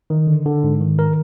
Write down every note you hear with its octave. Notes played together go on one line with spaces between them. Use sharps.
D#3
D3
D3
G#2
D#3
A#4